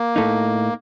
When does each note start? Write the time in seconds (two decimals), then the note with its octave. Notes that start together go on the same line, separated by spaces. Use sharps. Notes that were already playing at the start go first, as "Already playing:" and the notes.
Already playing: A#3
0.16 A2 A3 D#4